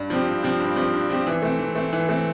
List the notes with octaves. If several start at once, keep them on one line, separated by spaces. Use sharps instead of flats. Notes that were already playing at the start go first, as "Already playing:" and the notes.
Already playing: G2
F3 C4 G4
G2
F3 C4 G4
G2
F3 C4 G4
G2
F3 C4 G4
E3
A3 C4
E3
A3 C4
E3
A3 C4